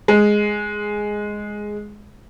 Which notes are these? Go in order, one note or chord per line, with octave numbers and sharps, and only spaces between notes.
G#3